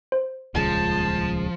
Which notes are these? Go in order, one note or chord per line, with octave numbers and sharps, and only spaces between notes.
C5
D#1 C#2 F3 G#3 A5